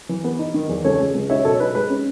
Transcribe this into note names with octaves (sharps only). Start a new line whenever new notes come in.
E3
B3
D#4
D#3
E2
C#2 A4 C#5
G#3
C#2
D#4 C#5 E5
B2 A4 C#5
D#4 B4
G#3 B4
C#4